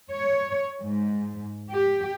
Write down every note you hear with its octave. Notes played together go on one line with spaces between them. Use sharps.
C#5
G#2
G4